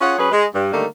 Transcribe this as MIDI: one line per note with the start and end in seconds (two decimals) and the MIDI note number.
0.01 0.15 61
0.01 0.15 65
0.01 0.15 68
0.01 0.15 73
0.01 0.15 78
0.18 0.32 54
0.18 0.32 61
0.18 0.32 68
0.18 0.32 71
0.32 0.45 56
0.54 0.73 43
0.73 0.85 50
0.73 0.85 51
0.73 0.85 55
0.73 0.85 57
0.73 0.85 58